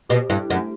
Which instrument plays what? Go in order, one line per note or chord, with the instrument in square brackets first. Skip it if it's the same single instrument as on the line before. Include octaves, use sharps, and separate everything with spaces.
[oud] B2 [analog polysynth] G4
[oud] G2 [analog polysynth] E4
[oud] F#2 [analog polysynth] A3